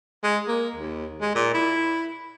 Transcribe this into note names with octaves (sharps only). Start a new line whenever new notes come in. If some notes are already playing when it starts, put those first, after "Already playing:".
G#3
A#3
D#2
G#3
A#2
E4